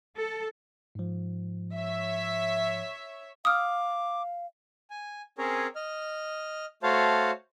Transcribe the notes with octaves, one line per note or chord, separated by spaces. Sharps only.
A4
G#2 F3
C#5 E5
F5 D6 D#6 F6
G#5
C4 C#4 G#4 A#4 C#5
D#5 F6
A3 F#4 C5 C#5 F5 A5